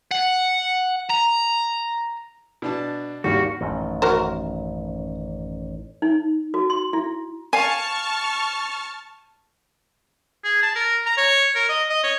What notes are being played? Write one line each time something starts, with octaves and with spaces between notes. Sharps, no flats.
F#5
A#5
B2 D4 A5
G#1 D#2 G3 F#4 F5
A1 F#2 D#3
F#4 A#4 C5
D#4
F#4
C6
E4
F5 G#5 A5 C#6 F6
G#4
A5
A#4
A#5
C#5
A#4
D#5
D#5
C#5